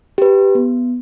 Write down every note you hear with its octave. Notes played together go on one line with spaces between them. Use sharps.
G4 B4
B3